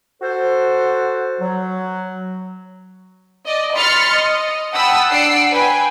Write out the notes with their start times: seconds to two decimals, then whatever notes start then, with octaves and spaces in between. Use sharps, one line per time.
0.22 F#4 A4 C5
1.40 F#3
3.46 D5 D#5
3.76 B5 C6 F6 A6 C#7
4.12 D#5
4.73 F#5 G5 A5 B5 D#6 E6
5.11 D4 F#5 E6 C7 D7
5.51 B4 G5 G#5